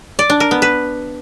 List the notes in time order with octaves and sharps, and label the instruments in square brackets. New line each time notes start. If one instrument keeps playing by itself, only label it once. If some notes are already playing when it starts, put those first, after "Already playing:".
[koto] D5
D4
A#4
B3
B4